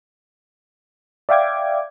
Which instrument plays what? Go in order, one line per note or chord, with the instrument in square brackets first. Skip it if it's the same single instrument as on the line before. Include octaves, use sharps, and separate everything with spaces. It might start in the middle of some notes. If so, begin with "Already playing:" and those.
[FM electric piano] D5 E5 F5 G5 D6 G#6